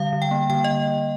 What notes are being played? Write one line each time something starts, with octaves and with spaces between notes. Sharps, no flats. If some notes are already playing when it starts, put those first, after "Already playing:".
Already playing: D3 G3 F5
D3
G5
A#3
D3 G5
D#5